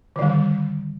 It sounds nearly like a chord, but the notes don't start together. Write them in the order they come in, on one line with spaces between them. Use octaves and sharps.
D3 D#3 G3